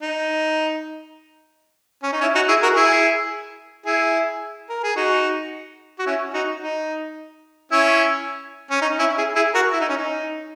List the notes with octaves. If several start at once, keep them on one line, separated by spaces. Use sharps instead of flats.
D#4
C#4
D#4
C#4 E4
D#4 F#4
E4 G#4
F#4 A#4
E4 G#4
E4 G#4
A#4
G#4
D#4 F#4
F#4
C#4 E4
D#4 F#4
D#4
C#4 E4
C#4
D#4
C#4 E4
E4 G#4
E4 G#4
F#4 A#4
E4
D#4
C#4
D#4